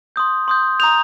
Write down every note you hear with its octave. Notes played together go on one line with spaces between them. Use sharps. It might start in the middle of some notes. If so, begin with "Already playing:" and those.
C6 D#6 G6
C6 D#6 G6
A#5 D#6 G6 F7